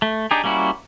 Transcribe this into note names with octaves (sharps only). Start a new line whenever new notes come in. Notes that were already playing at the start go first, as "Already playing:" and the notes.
A3
D4 D#4 G4 G#4
G3 A#3 C#4 E4 F#4